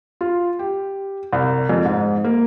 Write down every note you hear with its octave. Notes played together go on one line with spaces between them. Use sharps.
F4
G4
C2
F2
G#2
A#3